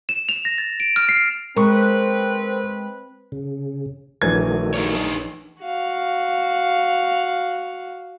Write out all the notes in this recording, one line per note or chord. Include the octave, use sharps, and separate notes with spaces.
E7
F7
A#6
A6
D7
F6
C7
G#3 C4 A#4 B4 C#6
C#3
A#1 D#3 E3 F#3 A3 G#6
D#4 A#4 C#5
F#4 F5